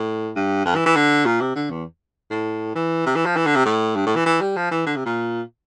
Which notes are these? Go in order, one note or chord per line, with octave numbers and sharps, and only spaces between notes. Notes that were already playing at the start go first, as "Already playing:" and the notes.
Already playing: A2
G2
F2
E3
E3
D3
A#2
C3
D3
E2
A2
E3
C3
E3
F3
E3
D3
C3
A2
G2
A2
E3
E3
G3
F3
E3
D3
C3
A#2